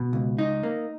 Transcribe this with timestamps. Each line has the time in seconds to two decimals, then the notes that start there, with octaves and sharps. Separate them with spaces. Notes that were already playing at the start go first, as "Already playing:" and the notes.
Already playing: B2
0.13 C#2
0.39 D#4
0.63 A#3